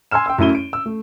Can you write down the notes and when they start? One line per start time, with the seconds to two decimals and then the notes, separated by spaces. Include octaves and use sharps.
0.11 G#5 C6 E6 F6 E7
0.26 G5 C6 E6
0.38 F#2 A3 E4 D#7 G7
0.55 D7
0.73 E6
0.86 A3